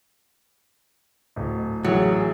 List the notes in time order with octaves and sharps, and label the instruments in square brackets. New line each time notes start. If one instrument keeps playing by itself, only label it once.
[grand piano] D1
[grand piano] A1 G#4 [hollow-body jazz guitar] F#3